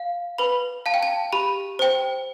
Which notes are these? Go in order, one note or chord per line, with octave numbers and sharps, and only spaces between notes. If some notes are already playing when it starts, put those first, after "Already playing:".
Already playing: F5
B4 B5
F5 A5
G5
A5
G4 B5
C5 G5